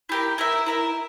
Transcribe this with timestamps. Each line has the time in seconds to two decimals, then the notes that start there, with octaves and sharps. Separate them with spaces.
0.09 E4 G4 A#4
0.38 E4 A#4 E5
0.66 E4 A#4 E5